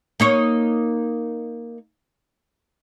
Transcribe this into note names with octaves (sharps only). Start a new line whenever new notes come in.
A#3 D#4 C#5